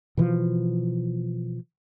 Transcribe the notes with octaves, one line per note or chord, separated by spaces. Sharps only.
B2 E3 F3